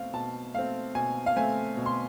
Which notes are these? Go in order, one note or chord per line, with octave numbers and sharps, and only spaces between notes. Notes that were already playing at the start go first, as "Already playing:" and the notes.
Already playing: B2 A3 C4 F5
B2 A5
A3 C4 F5
B2 G#5
F5
A3 C4 G#5
B2
C6